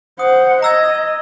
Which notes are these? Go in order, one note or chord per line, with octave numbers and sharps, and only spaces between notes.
C5 F#5 D#6
D#5 A#5 E6 G#6